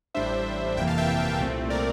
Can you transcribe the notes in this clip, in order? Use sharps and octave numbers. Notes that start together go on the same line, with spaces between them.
A1 A2 G3 D4 C5 E5
G1 F2 C3 E3 A#3 E5 G5
F5 A5
E5 G5
C2 A#2 A3 C4
A#4 D5